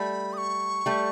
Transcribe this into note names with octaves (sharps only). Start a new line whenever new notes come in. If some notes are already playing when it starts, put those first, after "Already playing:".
Already playing: G3 A3 B5
D#6
C#6
G3 A3